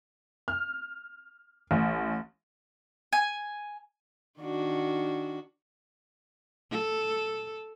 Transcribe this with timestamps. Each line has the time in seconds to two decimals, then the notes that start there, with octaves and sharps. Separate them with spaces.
0.48 F6
1.71 A1
3.13 G#5
4.40 D#3 D4 F#4
6.72 A4